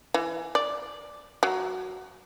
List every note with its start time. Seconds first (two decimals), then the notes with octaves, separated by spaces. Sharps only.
0.14 E3
0.55 D5
1.43 F#3